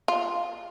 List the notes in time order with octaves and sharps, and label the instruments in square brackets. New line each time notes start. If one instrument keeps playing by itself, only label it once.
[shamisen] F4